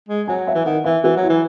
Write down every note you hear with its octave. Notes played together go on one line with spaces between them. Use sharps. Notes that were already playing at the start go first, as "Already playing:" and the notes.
G#3
F#3 G#5
E5
E3
D#3 F#5
E3 E5
E3 F#4
F#3
E4
E3